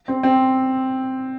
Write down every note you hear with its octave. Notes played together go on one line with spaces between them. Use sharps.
C4
C4